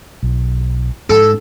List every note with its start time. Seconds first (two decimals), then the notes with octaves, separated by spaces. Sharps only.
0.23 B1
1.10 G#2 A4